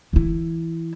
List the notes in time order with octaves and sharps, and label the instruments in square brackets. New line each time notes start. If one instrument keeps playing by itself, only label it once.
[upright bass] E3 E4